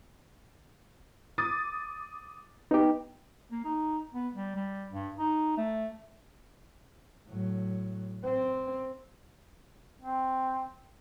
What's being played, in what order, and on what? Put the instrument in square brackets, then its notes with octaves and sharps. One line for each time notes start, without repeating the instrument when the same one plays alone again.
[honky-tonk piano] D6 D#6 A6
[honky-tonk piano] B3 [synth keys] D#4 G4
[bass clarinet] A#3
D#4
B3
G3
G3
G2
D#4
A3
[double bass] A2 F#3
C4
[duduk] C4